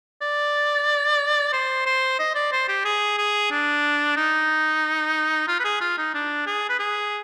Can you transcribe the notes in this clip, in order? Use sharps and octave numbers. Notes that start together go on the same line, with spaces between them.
D5
C5
C5
D#5
D5
C5
G4
G#4
G#4
D4
D#4
F4
B4
G#4
F4
D#4
D4
G#4
B4
G#4